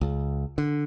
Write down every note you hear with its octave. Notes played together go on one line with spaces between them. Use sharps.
C#2
D3